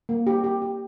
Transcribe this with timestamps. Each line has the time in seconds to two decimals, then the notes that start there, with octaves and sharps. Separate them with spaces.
0.09 A#3
0.27 G4
0.44 G4
0.62 G4